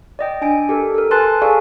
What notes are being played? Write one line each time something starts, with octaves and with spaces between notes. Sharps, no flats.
D5 D#5 G5
D4 G#5 D7
G4 A4 A#4
A4 A#4
B4 G#5 A5 C6 F#6 A6
G#4 A4 D5 F5 G#5 C#6